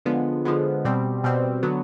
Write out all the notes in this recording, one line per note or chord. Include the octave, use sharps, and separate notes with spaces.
D3 F3 G#3 B3
D3 F3 G#3 B3
B2 G3 C4
B2 G3 C4
D3 F#3 B3